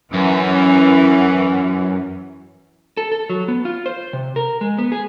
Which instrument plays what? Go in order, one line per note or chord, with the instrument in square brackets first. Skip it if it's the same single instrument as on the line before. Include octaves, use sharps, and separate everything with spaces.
[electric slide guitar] F#2 [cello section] E3 C#4
[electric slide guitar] A4
A4
F#3
B3
F4
C5
C3
A#4
G#3
B3
G#4